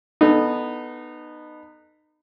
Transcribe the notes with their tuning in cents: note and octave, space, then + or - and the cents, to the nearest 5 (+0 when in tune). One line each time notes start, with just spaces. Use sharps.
B3 +0 D#4 -25 A4 +0